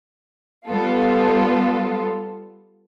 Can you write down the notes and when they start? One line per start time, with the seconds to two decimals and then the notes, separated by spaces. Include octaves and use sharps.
0.67 G3 B3 F4 A4